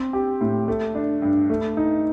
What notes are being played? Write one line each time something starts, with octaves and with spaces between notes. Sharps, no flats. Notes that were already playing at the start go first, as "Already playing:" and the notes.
Already playing: C4
G4
A2
A3
D4
G2
A3
D#4